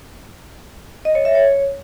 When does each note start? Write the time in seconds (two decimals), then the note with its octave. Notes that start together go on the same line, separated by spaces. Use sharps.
1.05 D#5
1.15 C#5
1.25 E5
1.35 C#5